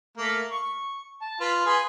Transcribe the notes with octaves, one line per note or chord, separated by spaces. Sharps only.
A3 A#3
C#6
A5
F4 B4
G#4 B4 C6